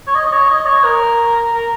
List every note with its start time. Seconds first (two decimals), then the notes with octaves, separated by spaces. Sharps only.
0.07 C#5
0.15 D#5
0.26 D#5
0.33 C#5
0.50 D#5
0.66 C#5
0.84 A#4
1.53 A#4